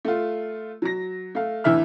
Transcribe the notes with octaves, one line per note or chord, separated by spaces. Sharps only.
A3 F4
F#3 A#6
A3 F5
A1 E2 D3 E3 E5 F6